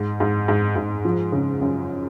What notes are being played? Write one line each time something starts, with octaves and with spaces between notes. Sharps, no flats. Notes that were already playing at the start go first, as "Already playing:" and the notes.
Already playing: G#2
G#2
G#2
G#2
F3
C#3
F#2